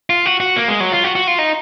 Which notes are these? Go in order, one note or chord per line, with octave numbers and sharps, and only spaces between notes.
F4
F#4
F#4
A#3
G#3
F#3
F4
F#4
F#4
F4
D#4